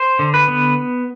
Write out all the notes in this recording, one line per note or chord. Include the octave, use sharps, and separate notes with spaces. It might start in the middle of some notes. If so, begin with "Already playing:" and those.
Already playing: C5
D3
B4
B3